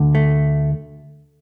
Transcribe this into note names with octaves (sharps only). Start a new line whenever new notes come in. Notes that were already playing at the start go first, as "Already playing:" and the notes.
Already playing: D2 D3
A3